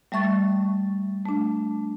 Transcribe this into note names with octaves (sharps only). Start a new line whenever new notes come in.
G3 A3 E5 C#6 A6
A3 D4